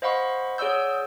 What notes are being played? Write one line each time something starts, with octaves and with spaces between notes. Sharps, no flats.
C5 D#5 F5 F#5 B5 C#6
G#4 C#5 D5 F#5 E6 G6